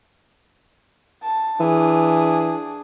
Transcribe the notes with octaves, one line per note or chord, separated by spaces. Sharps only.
A5
E3 D4 G#4